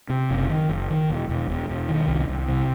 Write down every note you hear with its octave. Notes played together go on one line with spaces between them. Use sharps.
C3
F#1
D#3
F#1
D#3
E1
E1
E1
E1
D#3
C2
C2
C3